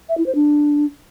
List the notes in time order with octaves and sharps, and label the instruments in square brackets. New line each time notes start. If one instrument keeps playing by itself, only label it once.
[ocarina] E5
E4
C5
D4